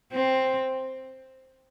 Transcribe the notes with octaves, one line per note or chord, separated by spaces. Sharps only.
C4